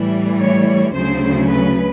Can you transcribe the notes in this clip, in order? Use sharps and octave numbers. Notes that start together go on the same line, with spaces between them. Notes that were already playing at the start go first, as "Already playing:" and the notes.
Already playing: A2 E3 G3
C#5
D2 C#3 F#3 C5
B4